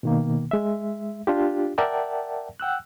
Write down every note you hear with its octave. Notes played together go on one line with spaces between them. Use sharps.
B2 D#3 A#3
G#3 E5
D4 F4 G4
A#4 D5 E5 F#5 G5 A5
F#5 G5 E6 F#6